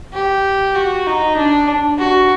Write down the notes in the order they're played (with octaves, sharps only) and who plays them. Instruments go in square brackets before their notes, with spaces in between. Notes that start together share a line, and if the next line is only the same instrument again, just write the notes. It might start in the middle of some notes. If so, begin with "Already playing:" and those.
[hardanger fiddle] G4
F#4
D#4
D4
F#4